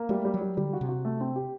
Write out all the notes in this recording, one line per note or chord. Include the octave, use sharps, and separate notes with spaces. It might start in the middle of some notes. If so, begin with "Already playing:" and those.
Already playing: A#3
G3 A3
G3
F#3
G3
D3 G3
F#4
C3
F#4
A3
C4
G4